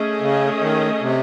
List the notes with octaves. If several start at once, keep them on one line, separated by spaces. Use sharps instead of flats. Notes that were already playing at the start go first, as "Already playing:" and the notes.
Already playing: A3 C#4 G#4 D#5
C#3
D#3
C3